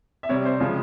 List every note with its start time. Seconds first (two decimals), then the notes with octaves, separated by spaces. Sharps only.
0.23 E5
0.29 C3 G3 C#5
0.45 C5
0.60 C#3 F3 G#3 G#4